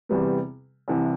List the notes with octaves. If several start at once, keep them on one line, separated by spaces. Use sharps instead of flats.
E2 C3 G3 B3
C2 C3 E3